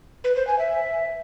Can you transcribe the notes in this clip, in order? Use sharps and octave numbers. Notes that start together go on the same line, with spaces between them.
B4
C5
G#5
E5